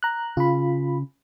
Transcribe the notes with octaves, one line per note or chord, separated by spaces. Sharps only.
A#5 F#6
C#3 F4 B5